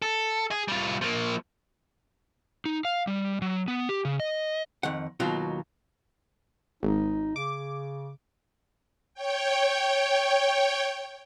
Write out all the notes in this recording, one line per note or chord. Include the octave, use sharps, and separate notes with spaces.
A4
G#4
G3 F4
F3 A#3
D#4
F5
G3
F#3
B3
G4
C#3
D#5
F2 D#3 F#5
D#2 B2 F#3 F4 F#4
G#1 D#4
C#3 D6
C#5 G5